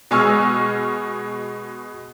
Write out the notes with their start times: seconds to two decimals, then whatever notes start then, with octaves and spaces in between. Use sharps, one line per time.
0.11 B2 G#3 G#5 C#6 E6 F6